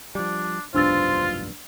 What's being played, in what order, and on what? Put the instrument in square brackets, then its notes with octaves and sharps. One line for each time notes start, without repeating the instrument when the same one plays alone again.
[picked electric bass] F3 G3 [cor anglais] D4
[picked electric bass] F1 B1 G2 [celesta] D4 E6 A6 [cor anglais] F4 [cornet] C5